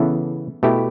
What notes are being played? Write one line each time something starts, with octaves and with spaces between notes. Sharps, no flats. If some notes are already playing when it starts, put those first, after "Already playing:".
Already playing: C#3 E3 B3 E4 A4
B2 A3 E4 G4